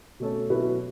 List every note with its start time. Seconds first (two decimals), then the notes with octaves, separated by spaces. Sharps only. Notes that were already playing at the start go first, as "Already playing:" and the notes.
0.20 B2 A3 C#4 A4
0.50 B2 F#3 C#4 E4 B4